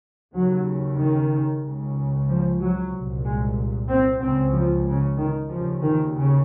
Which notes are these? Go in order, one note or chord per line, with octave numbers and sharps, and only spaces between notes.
D#2 C#3 F#3
D#3
C#2 C#3
F3
F#3
C2 A#2
G#3
C4
C#2 C#3 C4
F3
C#3
D#3
C#3 F3
D#2
D#3
C#3